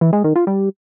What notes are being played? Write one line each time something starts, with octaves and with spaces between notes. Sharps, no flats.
E3
G#3
D#3
F4
G3